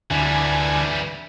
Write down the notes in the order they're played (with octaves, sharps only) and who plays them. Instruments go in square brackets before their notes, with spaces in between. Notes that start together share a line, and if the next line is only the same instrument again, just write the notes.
[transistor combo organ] D2 G#5 [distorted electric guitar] E3 G3